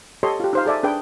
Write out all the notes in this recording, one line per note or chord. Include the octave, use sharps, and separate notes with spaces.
G4 A4 C#5 D#5 C6
F4 G4
D#4 C5 F5
G#4 A4 D5 E5 G#5
D4 G#4 B4 G5